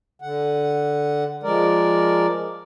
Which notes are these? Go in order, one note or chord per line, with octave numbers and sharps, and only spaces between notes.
D3 F#5
F3 G#3 A#4 D5